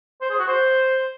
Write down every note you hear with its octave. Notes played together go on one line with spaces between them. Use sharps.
C5
G#4
F#4
C5